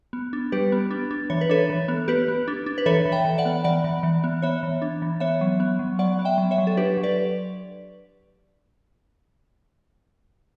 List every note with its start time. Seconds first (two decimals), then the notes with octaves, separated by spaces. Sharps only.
0.13 B3
0.33 D4
0.52 G3 G4 B4
0.72 B3
0.91 D4
1.11 D4
1.30 E3 C#5
1.41 B4
1.50 D4 A4 C#5
1.70 E3
1.88 B3
2.08 B3 G4 B4
2.28 B3
2.48 D4
2.66 D4
2.78 B4
2.86 E3 A4 C#5
3.05 E3
3.12 E5 G5
3.25 E3
3.38 D5 F#5
3.45 B3
3.64 E3 D5 F#5
3.84 E3
4.03 E3
4.24 B3
4.42 B3 C#5 E5
4.63 E3
4.82 D4
5.02 E3
5.20 B3 C#5 E5
5.41 F#3
5.60 B3
5.79 F#3
5.99 F#3 D5 F#5
6.19 B3
6.25 E5 G5
6.38 F#3
6.51 C#5 E5
6.58 F#3
6.67 A4
6.77 D4 G4 B4
6.97 F#3
7.03 B4 D5